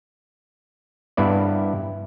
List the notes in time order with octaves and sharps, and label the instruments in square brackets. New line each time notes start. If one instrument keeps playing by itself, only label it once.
[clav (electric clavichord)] G2 B3 E4 D5